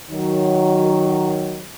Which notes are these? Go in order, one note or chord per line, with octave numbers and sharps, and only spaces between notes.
D#3 F#3